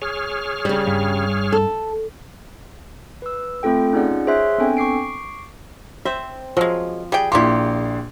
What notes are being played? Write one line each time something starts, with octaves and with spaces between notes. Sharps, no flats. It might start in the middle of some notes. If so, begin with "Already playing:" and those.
G#4 C#5 F6
C#3 G3
G2
A4
B4 E6
A3 C4 F4 A4 G5
C#4 D#4 F4 G#4 D5 F#5
G#4 C5 C#5 E5 C6 F#6
B3 C4 D4 A4 G5 G#5
C#6 D6 C7 D7
C4 C5 E5
F3 F#3 G#3
G3 G#4 G5
A#1 E4 F4 G4 C6